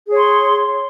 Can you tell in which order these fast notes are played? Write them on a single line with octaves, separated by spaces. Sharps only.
G#4 C#5 C6